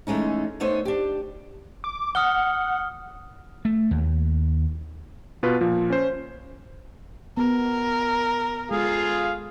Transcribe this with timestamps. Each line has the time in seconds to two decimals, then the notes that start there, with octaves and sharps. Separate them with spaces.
0.07 E3 G#3 A3 C#4 D#4
0.60 A3 B3 D#4 C5 C#5
0.85 D4 G4
1.84 D6
2.15 F#5 D#6 F6 G7
3.65 A3
3.91 D#2
5.43 B2 F4 B4
5.61 A#2 F3
5.90 C#4 C5
7.37 B3 A#4
8.71 G#3 F4 G#4 A4 F5